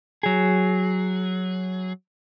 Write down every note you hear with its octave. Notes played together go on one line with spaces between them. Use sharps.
F#3 G#4